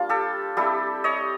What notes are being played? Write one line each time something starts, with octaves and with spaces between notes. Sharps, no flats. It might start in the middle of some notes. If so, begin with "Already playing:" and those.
Already playing: G3 A#3 D4 F4
G4 A4
G3 C4 E4 G4 A4
C#5 D#5